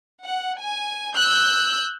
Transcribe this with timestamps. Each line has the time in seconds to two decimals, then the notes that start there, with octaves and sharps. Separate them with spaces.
0.23 F#5
0.59 G#5
1.15 E6 F#6 G6